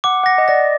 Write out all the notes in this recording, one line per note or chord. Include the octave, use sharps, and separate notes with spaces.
F#5 D6
F#5 A#6
D#5
D5 A#6